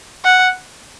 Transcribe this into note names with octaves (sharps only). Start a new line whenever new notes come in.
F#5